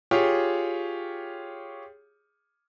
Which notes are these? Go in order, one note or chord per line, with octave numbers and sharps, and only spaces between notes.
F4 G4 G#4 C#5